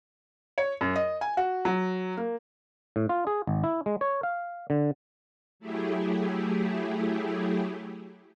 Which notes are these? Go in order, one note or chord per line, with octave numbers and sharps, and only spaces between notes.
C#5
F#2
D#5
G#5
F#4
F#3
A#3
A2
F4
G#4
G#1
E4
G#3
C#5
F5
D3
F#3 A3 E4 G4 G#4